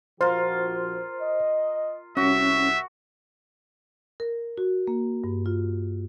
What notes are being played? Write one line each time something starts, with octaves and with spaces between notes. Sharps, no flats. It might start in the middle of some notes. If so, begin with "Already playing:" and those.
A#1 F3 F4 F#4 A#4 C5
D#5
C2 C#4 F#4 E5
A#4
F#4
A#3
G2
F4